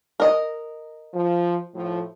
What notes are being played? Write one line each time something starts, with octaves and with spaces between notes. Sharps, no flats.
A#4 D#5
F3
A2 F3